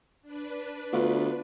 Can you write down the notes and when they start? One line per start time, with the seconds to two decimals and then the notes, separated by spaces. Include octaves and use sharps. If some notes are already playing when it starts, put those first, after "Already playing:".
0.22 D4 B4
0.92 D2 B3 F4